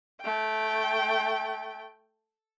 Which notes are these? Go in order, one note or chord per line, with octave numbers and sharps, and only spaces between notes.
A3 G5